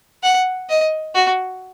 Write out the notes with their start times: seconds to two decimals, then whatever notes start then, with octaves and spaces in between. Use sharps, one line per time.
0.23 F#5
0.69 D#5
1.15 F#4